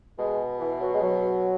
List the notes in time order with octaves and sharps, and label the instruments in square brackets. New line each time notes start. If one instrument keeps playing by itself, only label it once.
[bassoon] B2 [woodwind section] G#3
[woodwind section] E3
F#3
G#3
F#3